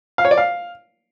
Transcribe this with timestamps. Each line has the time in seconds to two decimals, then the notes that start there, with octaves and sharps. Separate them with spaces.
0.18 F5
0.25 C#5
0.31 D5
0.38 F5